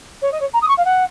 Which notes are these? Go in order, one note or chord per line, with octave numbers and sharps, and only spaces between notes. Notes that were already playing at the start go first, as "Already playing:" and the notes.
C#5
D#5
C#5
A#5
D#6
C#6
F5
F#5